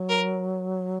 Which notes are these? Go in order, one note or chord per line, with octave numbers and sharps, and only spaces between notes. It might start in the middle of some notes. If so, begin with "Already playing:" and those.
Already playing: F#3
A#4